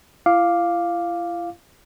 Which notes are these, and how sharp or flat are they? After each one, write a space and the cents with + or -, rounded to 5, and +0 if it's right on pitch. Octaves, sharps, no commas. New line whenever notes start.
E4 +45 F5 +0 D6 +0